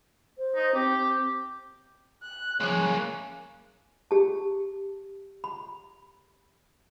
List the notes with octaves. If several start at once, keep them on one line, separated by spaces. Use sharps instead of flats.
C5
D#4
C4 G4
F#6
C#3 F3 G#3 A#3 C#4
G4 A5
B5